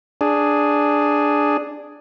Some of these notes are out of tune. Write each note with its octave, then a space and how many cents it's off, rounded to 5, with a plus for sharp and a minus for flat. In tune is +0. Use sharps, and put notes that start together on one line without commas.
D4 +0 G#4 +0